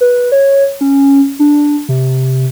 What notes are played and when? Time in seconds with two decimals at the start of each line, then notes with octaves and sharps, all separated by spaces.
0.01 B4
0.32 C#5
0.81 C#4
1.39 D4
1.89 C3